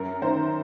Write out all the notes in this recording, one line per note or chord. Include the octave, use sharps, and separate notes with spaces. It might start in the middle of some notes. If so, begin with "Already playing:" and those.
Already playing: F#2 A#4
D#3 C5